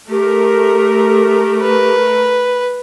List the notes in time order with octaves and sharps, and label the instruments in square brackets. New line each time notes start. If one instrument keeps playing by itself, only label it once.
[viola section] A3 A#4 [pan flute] G4
[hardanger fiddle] B4